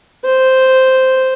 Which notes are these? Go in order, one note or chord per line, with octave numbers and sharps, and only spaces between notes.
C5